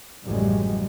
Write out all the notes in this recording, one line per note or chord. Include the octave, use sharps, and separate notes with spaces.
A1 F#2 C#3 F3 G3 G#3